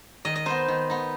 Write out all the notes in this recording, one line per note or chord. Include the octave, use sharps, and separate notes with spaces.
D#3 D#5
D#5
B3 D#4 C5
D#3
B3 D#4